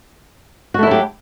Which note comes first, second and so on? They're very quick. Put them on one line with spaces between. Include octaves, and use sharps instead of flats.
F#4 A3 E4 F#3 G4